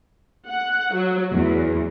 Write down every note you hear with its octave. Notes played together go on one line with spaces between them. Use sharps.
F#5
F#3
E2